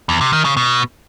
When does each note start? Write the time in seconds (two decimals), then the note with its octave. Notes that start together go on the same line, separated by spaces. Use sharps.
0.09 E2
0.21 C3
0.33 D#3
0.45 C#3
0.57 B2